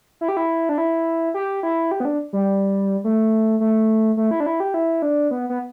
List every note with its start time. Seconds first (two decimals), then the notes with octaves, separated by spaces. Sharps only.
0.21 E4
0.29 G4
0.37 E4
0.69 D4
0.78 E4
1.34 G4
1.63 E4
1.91 G4
2.00 B3
2.05 D4
2.33 G3
3.04 A3
3.60 A3
4.17 A3
4.31 E4
4.40 D4
4.46 E4
4.60 G4
4.74 E4
5.02 D4
5.31 B3
5.50 B3